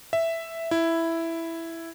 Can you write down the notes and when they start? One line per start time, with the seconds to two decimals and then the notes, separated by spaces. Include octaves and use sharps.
0.13 E5
0.71 E4